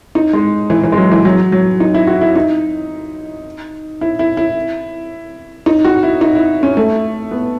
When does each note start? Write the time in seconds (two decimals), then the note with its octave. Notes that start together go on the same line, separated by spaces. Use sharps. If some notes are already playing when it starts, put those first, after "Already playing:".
0.15 D#4
0.33 G#3
0.70 E3
0.83 E3
0.92 G#3
0.98 F#3
1.11 E3
1.25 F#3
1.52 F#3
1.80 D#4
1.94 E4
2.07 F#4
2.21 E4
2.36 D#4
4.01 E4
4.19 E4
4.37 E4
5.66 D#4
5.85 F#4
6.03 E4
6.21 D#4
6.35 E4
6.63 C#4
6.77 A3
7.31 B3